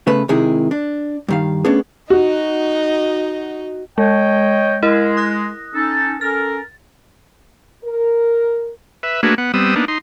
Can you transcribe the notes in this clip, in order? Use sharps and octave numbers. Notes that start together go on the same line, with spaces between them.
C#3 A3 B3 B4
C3 D#3 G#3 E4 G#4
D4
G2 D#3 F5
A3 B3 C#4 D4 G#4
D#4 F#4 D#5
G#3 C#5 D#5 G5
G#3 E4 A#4 D#5
D#6 F#6 A#6
C#4 D#4 A4
C#4 A4 A#4 A6
A#4
B4 E5
A3 A#3 D4 F#4 G#4 B4
B3 F#5
G3 B3 C4 D#6 E6
A#3 B3 D4 D#4
D#4 C6